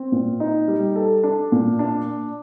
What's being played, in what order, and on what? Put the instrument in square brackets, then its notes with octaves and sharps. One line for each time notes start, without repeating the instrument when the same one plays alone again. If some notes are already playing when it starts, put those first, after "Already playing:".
Already playing: [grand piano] C4
A#2
D#4
G3
A4
D4
A#2
D4